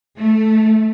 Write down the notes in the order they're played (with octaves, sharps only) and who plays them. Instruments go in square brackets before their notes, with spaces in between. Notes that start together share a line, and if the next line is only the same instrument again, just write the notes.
[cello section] A3